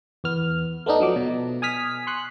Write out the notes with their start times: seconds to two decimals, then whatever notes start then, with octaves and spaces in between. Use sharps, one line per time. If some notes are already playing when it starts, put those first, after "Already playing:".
0.24 E2 B3 F6
0.86 A3 B3 D4 D#4
1.00 F3 F#3 D6
1.16 B2
1.62 G#5 D#6 F6 B6
2.07 C6 C#6 F#6